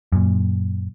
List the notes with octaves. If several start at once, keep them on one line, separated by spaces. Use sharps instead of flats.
F#2 A#2